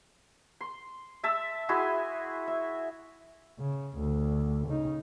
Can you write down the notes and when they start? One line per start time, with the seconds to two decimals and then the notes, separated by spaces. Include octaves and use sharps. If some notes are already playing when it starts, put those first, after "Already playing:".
0.61 C6
1.24 E5 A5 E6
1.69 E4 F#4 G#4 C6
2.47 E5
3.59 C#3
3.97 D2
4.68 C#3 D#4